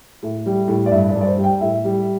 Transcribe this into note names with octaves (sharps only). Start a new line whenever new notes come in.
A2
G3
A2
D5
G2 E5
D5
G2
D5
C5
G3
G5
A2 E5
G3